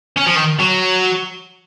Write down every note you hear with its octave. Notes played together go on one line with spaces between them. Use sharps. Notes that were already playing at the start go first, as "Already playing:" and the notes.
C#4
F3
D#3
F#3